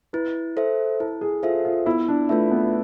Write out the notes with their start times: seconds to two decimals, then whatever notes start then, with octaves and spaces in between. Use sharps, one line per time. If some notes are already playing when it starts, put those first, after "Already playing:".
0.13 E4 B4
0.57 A4 C5 E5
1.00 E4 A4
1.21 G#4
1.43 F4 A4 C5 E5
1.65 F4
1.86 B3 E4
2.08 D4
2.29 A3 F4 B4 E5
2.51 B3